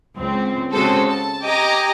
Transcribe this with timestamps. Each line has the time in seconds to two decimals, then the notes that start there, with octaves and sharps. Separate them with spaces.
0.18 C#2 C4
0.71 C#3 G#3 C4 F#4 A4 C5
1.09 A5
1.44 G4 D#5 G5 G#5 A#5 D6